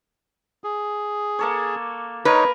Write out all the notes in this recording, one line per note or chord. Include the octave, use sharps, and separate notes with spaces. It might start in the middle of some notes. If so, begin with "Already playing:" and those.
G#4
A#3 A4 C#5
D#4 A#4 B4 C#5